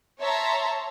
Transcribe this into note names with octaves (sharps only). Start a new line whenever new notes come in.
C#5 E5 A5 A#5 C6